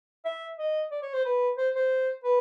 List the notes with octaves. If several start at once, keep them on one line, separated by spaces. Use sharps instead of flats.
E5
D#5
D5
C#5
C5
B4
C5
C5
B4